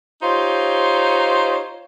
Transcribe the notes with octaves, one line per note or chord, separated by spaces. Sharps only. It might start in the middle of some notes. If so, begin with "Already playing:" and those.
D#4 F4 G4 C5 C#5